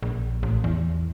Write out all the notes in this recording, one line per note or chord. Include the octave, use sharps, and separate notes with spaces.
A#1
A1
E2